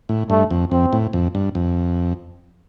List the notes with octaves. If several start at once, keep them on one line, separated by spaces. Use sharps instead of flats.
A2
G2 A3
F2
F2 C4
A2
F2
G2
F2